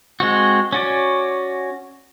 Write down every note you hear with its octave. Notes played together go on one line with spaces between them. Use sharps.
G#3 C4 F#4
C#4 F#4 D5